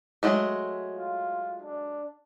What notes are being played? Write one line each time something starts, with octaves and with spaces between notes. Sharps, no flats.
F#3 G#3 A3
F4
D4